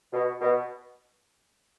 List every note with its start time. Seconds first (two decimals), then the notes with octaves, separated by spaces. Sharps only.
0.12 B2
0.41 B2